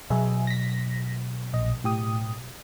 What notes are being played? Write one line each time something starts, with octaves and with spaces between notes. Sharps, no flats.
B2 F#3 G#4 E5
A#6 B6
A#1 D#5
A2 G4 D#6